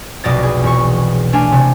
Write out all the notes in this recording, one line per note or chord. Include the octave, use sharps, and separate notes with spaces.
F1 B1 B2 D5 D#5 A6
G#4
E1 C#6
A3 D4 F5 G#5
C3